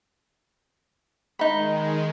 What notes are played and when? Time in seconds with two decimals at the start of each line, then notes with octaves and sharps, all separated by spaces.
1.39 D#3 G#3 D#4 B5